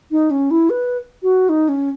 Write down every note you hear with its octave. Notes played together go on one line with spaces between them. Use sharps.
D#4
C#4
E4
B4
F#4
D#4
C#4